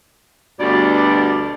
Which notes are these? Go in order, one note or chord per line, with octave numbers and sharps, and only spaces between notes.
D2 G2 B2 D5